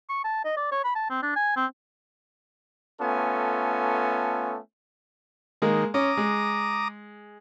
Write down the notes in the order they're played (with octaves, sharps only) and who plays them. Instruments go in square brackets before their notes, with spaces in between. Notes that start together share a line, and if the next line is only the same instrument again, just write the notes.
[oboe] C#6
A5
D#5
D5
C#5
B5
A5
C4
D4
G#5
C4
[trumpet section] A3 B3 C#4 F4 A4 G#5
[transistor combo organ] D#3 [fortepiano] G#3 A#3
[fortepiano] C#4 [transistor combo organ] A#5 D6 D#6
[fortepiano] G#3